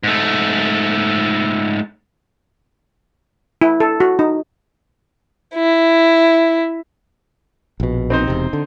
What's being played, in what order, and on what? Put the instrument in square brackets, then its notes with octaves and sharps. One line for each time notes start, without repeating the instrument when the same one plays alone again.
[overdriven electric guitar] G#2 A3
[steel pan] E4
A4
F#4
D#4
[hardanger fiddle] E4
[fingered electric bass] A#1 B2
[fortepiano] C4 D#4 C5
[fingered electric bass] E1 C3
D3